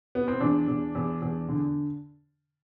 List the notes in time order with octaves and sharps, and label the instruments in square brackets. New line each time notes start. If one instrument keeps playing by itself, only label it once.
[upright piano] B3
C4
E2 D4
E2
E2
E2
D3